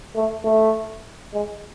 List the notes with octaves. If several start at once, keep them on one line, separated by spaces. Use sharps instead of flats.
A3
A3
G#3